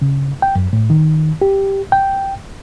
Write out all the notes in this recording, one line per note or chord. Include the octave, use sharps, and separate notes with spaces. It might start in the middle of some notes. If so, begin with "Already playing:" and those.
C#3
G5
F#2
A2
D#3
G4
G5